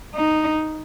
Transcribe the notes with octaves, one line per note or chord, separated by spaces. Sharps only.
D#4